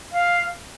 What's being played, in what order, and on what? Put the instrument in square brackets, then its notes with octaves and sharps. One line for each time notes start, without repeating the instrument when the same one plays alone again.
[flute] F5